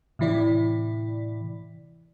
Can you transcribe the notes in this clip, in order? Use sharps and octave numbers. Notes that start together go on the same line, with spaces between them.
A2 C3 E3 E4 D5